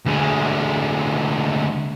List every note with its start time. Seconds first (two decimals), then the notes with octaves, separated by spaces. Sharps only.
0.06 D2 G#3